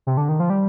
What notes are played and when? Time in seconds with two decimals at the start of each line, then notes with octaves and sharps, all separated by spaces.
0.07 C3
0.17 D3
0.29 D#3
0.40 F3
0.50 G3